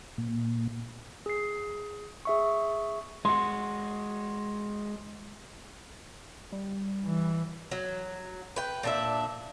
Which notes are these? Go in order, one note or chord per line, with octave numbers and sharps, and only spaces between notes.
A#2
G#4 C7
G#4 E5 C#6
G#3 F#4 C6
G3
E3
F#3
B4 G5
A#2 D4 E5